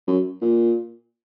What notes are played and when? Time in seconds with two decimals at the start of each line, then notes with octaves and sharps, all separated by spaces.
0.08 F#2
0.42 A#2